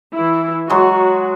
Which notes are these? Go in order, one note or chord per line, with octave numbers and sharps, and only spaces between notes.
E3 E4
F#3 G#3 F#4